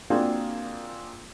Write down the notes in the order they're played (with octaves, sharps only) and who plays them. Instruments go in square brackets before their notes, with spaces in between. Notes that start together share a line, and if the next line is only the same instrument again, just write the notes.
[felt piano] A#3 C4 D4 F4 F#4 G#4